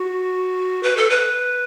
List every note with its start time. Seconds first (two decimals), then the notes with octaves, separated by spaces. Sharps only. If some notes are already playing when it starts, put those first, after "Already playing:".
Already playing: F#4
0.83 B4
0.97 A4
1.10 B4